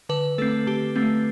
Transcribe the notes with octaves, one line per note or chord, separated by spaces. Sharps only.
D3 B4
A3 C4 A4
D3 G4
A3 C4